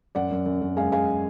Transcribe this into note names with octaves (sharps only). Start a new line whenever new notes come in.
F#2 D5 F#5
F#2
F#2
F#2
G#3 F5 G#5
G#3 F5 G#5